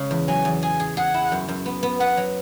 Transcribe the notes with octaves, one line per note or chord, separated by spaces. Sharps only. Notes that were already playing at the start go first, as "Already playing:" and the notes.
Already playing: C#3 G#3
E2
F#3 G#5
E2
G#4 G#5
G#4
G#4 F#5
E4
F#2
F#2
B3
B3
B3 F#5
F#3